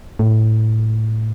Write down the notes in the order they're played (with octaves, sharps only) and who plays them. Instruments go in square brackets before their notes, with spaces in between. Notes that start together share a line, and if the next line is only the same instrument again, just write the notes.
[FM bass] A2